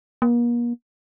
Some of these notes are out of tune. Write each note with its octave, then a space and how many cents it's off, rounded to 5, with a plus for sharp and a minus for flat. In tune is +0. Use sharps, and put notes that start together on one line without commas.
A#3 +40